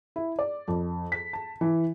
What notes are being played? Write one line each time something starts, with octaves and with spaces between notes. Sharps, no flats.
E4
D5
F2
B6
A5
E3